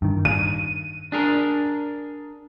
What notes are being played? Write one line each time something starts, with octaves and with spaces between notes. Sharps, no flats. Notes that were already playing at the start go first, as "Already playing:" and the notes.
G2 D#3
D#7
D4 G#4 A#4